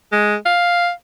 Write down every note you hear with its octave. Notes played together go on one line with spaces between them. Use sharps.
G#3
F5